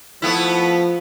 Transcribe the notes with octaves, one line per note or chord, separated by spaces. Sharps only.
F3 A3 B3 E4